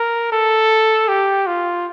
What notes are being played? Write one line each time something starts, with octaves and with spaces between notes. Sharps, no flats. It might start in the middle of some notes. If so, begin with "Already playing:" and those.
Already playing: A#4
A4
G4
F4